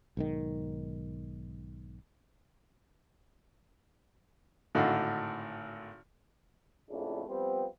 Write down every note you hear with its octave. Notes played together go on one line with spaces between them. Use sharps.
B1 G#2 D#3
G#1 A2 D3 D#4 F#4 F5
A#1 F2 C#3 A3 D4 E4
F3 G3 B3 C4